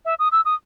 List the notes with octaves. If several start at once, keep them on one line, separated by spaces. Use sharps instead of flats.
E5
D#6
E6
D#6